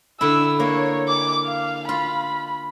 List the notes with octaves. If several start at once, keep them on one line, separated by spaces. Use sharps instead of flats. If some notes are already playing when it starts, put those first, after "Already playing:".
D3 E4 E6
A#3 C#5
D6
F5
F4 B5